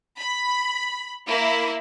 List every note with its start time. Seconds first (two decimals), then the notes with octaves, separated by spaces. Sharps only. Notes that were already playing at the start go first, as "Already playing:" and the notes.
0.18 B5
1.28 A#3 E4